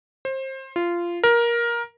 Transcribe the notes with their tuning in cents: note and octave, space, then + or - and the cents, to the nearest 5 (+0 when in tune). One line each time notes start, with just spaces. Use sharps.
C5 +25
F4 -15
A#4 +15